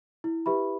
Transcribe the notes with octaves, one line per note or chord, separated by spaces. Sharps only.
E4
G4 B4 E5 B5